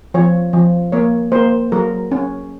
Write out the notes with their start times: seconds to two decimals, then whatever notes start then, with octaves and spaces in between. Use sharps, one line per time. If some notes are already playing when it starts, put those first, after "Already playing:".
0.14 F3 C#5
0.53 F3
0.92 A#3 C#5
1.32 A#3 C5
1.72 F#3 A#4
2.12 C#4